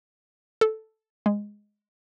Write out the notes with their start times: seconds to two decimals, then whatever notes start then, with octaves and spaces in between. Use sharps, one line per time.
0.61 A4
1.26 G#3